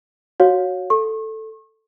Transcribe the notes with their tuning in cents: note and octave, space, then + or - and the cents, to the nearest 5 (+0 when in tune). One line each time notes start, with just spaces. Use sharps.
F#4 +0 C#5 +0 F5 +35
A4 +0 C#6 -40